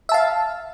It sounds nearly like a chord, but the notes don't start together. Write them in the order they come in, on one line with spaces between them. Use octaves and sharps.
E5 A5 F5